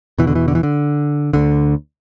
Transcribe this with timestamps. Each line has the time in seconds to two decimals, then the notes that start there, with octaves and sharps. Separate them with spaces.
0.19 E2 B2 E3
0.27 D3
0.35 E3
0.48 D3
0.55 E3
0.63 D3
1.33 D2 D3